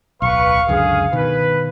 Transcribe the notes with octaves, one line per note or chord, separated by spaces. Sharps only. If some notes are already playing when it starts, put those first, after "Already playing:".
D1 B1 B4 F5 C#6
C#2 F#2 D3 G#4
B2 D#3 B4